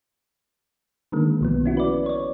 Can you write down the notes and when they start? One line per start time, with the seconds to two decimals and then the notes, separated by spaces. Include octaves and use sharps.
1.12 D3 D#3 G#3 A#3
1.41 B1 F3 B3
1.66 C#4 E4 F#4
1.77 B4 D5
2.06 C#5 D5